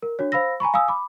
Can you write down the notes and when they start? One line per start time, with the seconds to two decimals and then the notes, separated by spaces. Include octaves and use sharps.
0.02 A#4
0.19 D4 F#4 C#5
0.32 C5 F5 B5 E6 A#6
0.60 G#5 A#5 B5 C#6
0.74 F5 G#5 D#6 E6
0.88 B5 D6